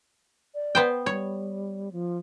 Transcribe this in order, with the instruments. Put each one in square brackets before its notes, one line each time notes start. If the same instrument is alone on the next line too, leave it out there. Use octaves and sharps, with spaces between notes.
[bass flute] D5
[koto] B3 C5 G5
[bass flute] G3 [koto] C#5
[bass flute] F3